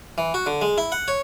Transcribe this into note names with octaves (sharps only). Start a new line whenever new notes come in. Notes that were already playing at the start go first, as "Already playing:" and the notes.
E3
F#4
D3
G#3
E4
F#5
C#5